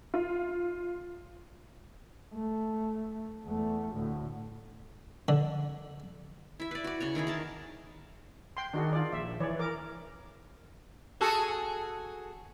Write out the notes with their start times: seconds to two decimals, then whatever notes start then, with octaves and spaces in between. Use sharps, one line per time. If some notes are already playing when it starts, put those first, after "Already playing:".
0.14 F4
2.34 A3
3.45 E2 A3
3.93 D2 A2
5.28 D3
6.60 E4 E5
6.71 B4 D5
6.84 F#4 D5
7.00 C#3 F#4 C#5
7.15 D#3 E3 E4 G#4
7.27 D#3 A#4 A5
8.57 G5 C6
8.73 D#3 D4 F#4 G#4
8.93 F4 D5
9.13 A#1 E5
9.40 E3 C#5 D5
9.59 A#4 D6
11.21 F#4 G#4 A4